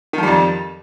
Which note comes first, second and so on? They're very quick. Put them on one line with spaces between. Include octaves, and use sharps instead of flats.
D#3 F3 G3 F2